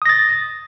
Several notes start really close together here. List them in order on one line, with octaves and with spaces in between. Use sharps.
D#6 A#6 A6